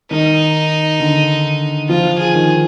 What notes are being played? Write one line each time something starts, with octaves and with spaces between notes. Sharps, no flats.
D#3 D#4
D3
F3 F4
G#4
D#3